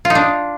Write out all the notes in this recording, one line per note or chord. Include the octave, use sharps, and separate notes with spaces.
F4
D#4
D4